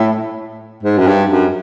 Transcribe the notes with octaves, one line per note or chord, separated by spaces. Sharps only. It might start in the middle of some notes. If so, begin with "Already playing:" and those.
Already playing: A2
G#2
F#2
G2
F#2